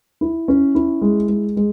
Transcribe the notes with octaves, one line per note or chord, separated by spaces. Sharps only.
E4
C#4
E4
G#3
G#3
G#3